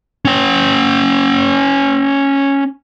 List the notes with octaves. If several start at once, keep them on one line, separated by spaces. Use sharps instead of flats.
C#4 G5